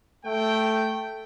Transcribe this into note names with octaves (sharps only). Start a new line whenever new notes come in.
A3 G5